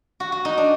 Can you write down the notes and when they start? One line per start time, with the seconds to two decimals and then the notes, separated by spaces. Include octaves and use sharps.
0.20 F#4
0.32 F#4
0.45 D#4
0.58 D4